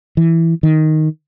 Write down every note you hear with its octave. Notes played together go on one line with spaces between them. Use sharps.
E3
D#3